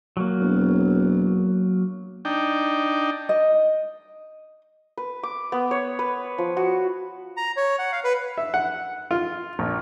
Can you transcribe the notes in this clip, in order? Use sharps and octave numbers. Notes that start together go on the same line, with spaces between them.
F#3 A#3
E1
D4 D#4 G5
D#5
B4
D6
B3
C#5
B4
F3
F#4
A#5
C#5
F#5
F5
B4
E5
F#5
F4
A#1